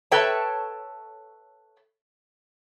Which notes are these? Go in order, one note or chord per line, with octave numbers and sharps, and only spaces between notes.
A4 B4 C#5 E5 G5 A5